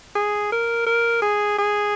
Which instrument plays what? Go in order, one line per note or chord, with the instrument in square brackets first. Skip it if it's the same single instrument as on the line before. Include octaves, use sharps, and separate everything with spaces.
[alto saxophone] G#4
A#4
A#4
G#4
G#4